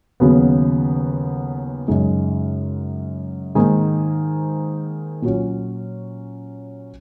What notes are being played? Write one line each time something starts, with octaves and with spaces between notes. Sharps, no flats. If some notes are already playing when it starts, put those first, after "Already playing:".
D#2 C#3 F#3 B3
F#2 C#3 G#3 D#4
G#2 D#3 A#3 D#4 G#4
A#2 F#3 C#4